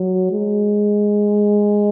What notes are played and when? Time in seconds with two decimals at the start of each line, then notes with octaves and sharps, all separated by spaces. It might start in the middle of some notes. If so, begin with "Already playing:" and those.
Already playing: F#3
0.31 G#3